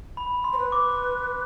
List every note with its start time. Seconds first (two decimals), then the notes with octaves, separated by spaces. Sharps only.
0.17 B5
0.44 C6
0.53 C5
0.58 B4
0.72 D6